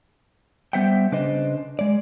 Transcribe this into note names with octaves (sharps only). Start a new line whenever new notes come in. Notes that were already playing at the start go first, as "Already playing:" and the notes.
G3 B3 C5 E5 F#5 G5
C#3 D4 B4 C5 D#5
G#3 D5